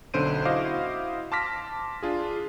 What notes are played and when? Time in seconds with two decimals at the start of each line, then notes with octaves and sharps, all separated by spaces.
0.14 B1 D3 C#4 C5 D7 D#7
0.45 E4 F#4 C5 D#5 F5 D6
1.32 A5 C6 D6 F6 A#6 B6
2.03 D4 F4 G#4